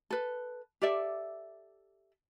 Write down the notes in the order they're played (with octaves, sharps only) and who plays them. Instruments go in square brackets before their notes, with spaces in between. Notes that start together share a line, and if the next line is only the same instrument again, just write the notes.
[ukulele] A4 B4
G4 A4 D5 E5